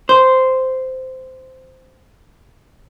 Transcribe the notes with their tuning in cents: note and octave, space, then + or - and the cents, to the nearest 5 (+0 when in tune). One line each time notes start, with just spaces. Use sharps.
C5 -10